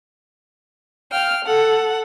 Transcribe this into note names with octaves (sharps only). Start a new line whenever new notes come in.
F5 G5 F6
A4 F#5